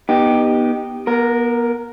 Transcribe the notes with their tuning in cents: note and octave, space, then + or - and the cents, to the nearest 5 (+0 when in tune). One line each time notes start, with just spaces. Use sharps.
B3 -25 D#4 -10 G4 +0
B3 -35 A#4 +0